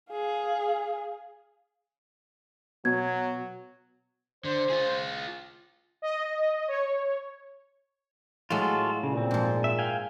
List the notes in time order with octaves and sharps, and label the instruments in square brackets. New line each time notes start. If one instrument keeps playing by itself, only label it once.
[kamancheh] G#4 F5
[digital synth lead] B2 [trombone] F#3 [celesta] G#6
[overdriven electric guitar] D3 [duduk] C5
[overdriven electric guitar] F4 G#4
[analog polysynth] D#5
C#5
[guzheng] A2 F#3 G#3 [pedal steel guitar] F4 F#4 A4
[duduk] A#2 [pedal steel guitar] C#3
[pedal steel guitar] C4
[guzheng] G#2 F3
[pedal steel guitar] E5
F5 G5 G#5